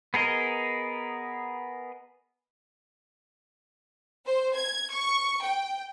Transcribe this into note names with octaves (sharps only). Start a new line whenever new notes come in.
B3 G#4 A#4 D#5
C5
G#6
C#6
G5